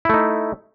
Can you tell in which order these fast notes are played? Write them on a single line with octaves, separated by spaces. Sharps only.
E4 A3 D#4